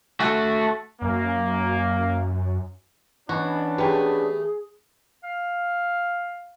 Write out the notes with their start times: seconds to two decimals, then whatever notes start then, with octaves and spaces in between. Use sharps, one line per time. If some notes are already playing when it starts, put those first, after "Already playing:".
0.20 A3 F#4
1.02 F#2 A#3
3.29 E3 B3 C#4 D4 F#4 D#5
3.78 C3 A3 G4 G#4 B4
5.24 F5